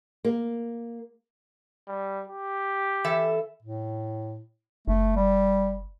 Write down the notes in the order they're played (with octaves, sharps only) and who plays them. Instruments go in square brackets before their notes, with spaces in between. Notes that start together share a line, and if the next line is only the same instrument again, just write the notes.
[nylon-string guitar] A#3
[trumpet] G3
G4
[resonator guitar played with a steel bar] E3 A4 E5
[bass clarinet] A2
[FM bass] F#1 [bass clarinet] A3
[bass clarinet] G3